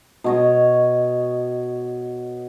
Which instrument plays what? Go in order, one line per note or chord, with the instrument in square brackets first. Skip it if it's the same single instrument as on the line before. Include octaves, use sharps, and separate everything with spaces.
[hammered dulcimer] B2 C#5 D#5